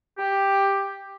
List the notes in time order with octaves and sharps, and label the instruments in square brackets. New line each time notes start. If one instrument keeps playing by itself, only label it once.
[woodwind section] G4